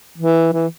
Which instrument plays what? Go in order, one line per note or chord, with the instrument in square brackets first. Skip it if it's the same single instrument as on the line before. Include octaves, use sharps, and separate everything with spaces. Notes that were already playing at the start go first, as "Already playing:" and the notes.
[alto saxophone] E3
E3